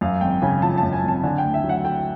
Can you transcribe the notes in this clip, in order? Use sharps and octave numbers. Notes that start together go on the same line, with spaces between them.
F#2 F5
G#1 G5
C#3 G#5
F3 A5
A5
F#2
G#5
G#1 A5
D3 G#5
D2 G5
E5
F#3
F#5
A3 G5